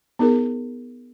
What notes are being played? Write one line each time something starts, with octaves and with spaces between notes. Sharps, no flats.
B3 D#4 G#4 A#4